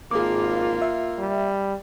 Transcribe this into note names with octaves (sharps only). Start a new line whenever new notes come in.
G#1 A#3 F4 G#4 D6
E5
G3